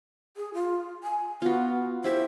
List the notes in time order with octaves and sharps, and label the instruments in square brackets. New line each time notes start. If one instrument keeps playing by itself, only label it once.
[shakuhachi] G#4
F4
G#5
[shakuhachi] B3 [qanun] F4 F#4
[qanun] E4 G4 E5 [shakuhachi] C5